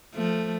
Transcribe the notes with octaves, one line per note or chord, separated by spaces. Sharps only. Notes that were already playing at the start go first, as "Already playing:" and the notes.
F3 A3